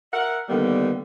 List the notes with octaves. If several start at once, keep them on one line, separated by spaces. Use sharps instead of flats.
A#4 E5 F#5
D3 D#3 G3 A#3 B3